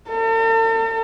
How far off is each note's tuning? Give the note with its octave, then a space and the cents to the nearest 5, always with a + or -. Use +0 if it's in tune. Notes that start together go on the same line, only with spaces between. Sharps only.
A4 +45